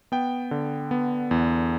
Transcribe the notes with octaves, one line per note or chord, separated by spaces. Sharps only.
B3 G5
D3
B3
E2